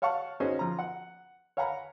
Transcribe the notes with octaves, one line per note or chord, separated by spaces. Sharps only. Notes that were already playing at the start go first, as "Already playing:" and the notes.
C#5 F5 F#5 A5 C#6
C#4 D#4 F#4 G#4 C5 C#5
F3 A#5
F#5
C#5 F5 F#5 G#5 A#5 B5